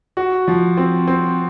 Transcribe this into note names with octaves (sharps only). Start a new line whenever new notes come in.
F#4
F3
C4
C4